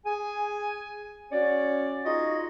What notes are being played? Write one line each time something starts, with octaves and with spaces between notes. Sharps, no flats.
G#4 G#5
C#4 F#4 C#5 D5
D#4 F4 F#4 G#4 D#5